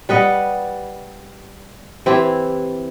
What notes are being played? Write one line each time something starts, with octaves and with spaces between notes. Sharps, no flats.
G3 B4 D#5 F#5
E3 C4 E4 G4